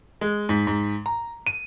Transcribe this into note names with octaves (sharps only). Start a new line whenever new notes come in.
G#3
G#2
G#2
A#5
D#7